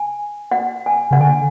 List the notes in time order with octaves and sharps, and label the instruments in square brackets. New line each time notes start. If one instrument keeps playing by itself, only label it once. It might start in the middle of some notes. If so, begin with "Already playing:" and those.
Already playing: [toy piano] G#5
F#5
G#5
[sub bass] C#3 [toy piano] F#5
[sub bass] D3 [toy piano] G#5